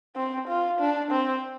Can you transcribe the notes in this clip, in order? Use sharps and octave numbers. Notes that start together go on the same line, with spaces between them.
C4
F4
D4
C4